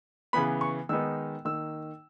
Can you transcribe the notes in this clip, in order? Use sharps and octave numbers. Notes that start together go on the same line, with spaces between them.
C#3 E3 B3 B5
C#6
D#3 G#3 B3 D#4 E6
D#3 A#3 D#4 E6